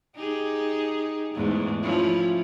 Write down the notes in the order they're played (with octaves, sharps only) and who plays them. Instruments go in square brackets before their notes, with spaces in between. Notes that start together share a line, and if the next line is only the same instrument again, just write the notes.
[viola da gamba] D#4 G4 G#4
E2 G#2 A3
F3 C#4 E4